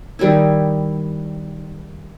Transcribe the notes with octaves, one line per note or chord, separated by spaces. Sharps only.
D#3 G3 D#4 E4